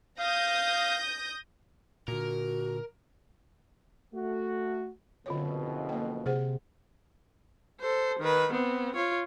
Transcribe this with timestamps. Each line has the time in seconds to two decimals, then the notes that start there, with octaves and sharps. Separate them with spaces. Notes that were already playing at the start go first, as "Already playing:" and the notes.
0.19 F5 D#6 G6 A#6
2.08 A#2 D3 F#4 A#4
4.13 A3 F#4
5.26 F#1 F2 B2 D3 F4 C#5
5.89 A#3 G5
6.26 C3 G#4 C5 F#5
7.81 A4 C5
8.19 D#3 B4
8.52 B3 C4
8.95 F4 C#5